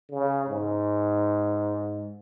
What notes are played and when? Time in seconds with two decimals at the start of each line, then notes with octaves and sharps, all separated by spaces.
0.11 C#3
0.49 G#2